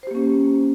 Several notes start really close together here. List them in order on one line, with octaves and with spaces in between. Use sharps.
C5 G4 A#3 C#4